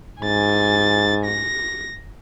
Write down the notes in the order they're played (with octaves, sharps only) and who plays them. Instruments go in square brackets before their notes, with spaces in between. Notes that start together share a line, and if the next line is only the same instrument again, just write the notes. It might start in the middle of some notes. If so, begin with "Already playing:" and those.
[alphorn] G#2 [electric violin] G#5 A6
[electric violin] A#6